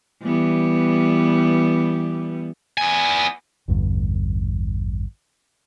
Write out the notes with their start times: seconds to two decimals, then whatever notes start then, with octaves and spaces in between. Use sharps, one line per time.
0.22 E3 G3 B3
2.78 B3 G#5
3.68 A1 E2 G2 D3